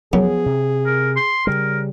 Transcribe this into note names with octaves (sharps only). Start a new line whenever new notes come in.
F#2 F3 B3 G#4
C3
A#4
C6
C#3 G3 A#4